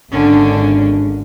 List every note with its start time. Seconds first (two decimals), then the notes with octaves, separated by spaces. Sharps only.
0.11 G#1 D3 C#4 D4